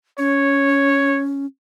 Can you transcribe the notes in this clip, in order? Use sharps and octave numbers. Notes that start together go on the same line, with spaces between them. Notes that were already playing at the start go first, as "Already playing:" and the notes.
C#4 C#5